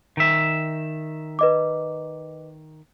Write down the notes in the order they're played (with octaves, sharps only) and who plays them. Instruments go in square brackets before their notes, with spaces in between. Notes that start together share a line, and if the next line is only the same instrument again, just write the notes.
[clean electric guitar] D#3 E5
[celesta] B4 D#5 D6